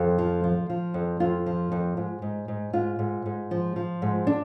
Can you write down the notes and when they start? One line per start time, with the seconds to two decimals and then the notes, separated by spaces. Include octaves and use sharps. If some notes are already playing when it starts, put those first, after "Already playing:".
Already playing: F2
0.18 F3
0.44 F3
0.70 F3
0.94 F2
1.20 F2 F4
1.46 F3
1.72 F2
1.97 G#2
2.22 G#2
2.48 G#2
2.73 G#2 F4
2.99 G#2
3.26 G#2
3.51 F3
3.76 F3
4.02 G#2
4.27 D4